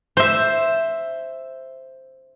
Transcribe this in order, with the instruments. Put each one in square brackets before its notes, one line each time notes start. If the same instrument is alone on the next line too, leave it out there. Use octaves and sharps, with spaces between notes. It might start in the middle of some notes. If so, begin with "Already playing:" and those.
[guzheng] C5 E5